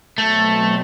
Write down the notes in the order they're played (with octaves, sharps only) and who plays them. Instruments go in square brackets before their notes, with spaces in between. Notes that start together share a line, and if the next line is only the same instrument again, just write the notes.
[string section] B2 F#3 C4 [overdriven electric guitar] A3